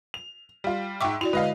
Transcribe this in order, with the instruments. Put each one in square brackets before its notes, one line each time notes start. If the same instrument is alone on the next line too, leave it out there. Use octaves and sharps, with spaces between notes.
[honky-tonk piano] F7
G3 F4
[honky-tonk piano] G#2 E5 [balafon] G5 C#6 D6
[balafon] E4 F#4 D5 [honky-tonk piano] F7
[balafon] D3 G#3 [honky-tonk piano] B4 D#5 F5